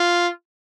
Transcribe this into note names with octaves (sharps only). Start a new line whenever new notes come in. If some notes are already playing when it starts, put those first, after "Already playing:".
Already playing: F4